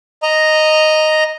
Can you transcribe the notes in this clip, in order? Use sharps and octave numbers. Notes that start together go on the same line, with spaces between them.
D#5 A#5